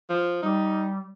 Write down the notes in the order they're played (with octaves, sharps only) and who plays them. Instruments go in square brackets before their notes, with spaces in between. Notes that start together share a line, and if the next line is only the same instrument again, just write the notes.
[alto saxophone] F3
[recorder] G3 [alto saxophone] D#4